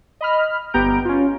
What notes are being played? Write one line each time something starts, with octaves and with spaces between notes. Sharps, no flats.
D#5 B5 F6
G1 B3 G4 A#5 G6 D7
C#4 F4